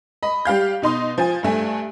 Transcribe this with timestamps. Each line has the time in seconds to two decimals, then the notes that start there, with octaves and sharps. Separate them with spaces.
0.23 D#5 B5
0.45 G3 G4 F5 G6
0.82 B2 D#4 C6 D#6
1.18 F3 G#5
1.43 G2 A3 G#5